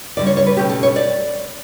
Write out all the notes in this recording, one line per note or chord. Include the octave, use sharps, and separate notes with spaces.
D2 C#3 G3 D5
C#5
C#5
B4
B2 A3 C#4 G4
A4
C#5
D5